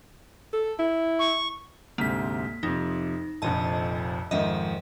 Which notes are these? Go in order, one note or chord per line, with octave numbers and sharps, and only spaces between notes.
A4
E4
C#6
D2 G#2 C3 A#3 B6
F2 C3 D#4
F1 A#1 F2 D#5 A5
F2 G#2 D#3 D#5 E5